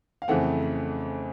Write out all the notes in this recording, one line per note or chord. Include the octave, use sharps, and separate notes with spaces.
F5
F2 C#3 E3 A3 C4 F#5